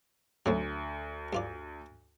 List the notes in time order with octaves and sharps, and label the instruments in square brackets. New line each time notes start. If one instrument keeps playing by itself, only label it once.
[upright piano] D2 [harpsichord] F#3 A3 C4
[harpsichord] G2 F4 D5